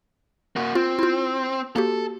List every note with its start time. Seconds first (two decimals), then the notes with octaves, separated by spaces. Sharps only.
0.56 A#3 F#4
0.75 C4 F4
0.99 E4 F4
1.76 A#3 F#4 G4 A4